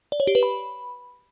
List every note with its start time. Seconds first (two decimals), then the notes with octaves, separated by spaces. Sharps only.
0.12 D5
0.20 C#5
0.27 G4
0.35 B4
0.43 B5